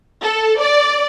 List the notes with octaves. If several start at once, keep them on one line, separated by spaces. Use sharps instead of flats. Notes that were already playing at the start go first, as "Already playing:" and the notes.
A4
D5